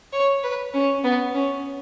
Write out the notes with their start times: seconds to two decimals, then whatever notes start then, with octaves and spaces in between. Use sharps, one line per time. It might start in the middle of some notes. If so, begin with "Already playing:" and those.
0.13 C#5
0.43 B4
0.73 C#4
1.04 B3
1.34 C#4